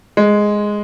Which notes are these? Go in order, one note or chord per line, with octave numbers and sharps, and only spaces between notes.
G#3